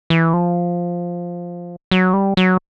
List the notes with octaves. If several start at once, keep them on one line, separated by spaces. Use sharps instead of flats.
E3
F3
F#3
G3
F#3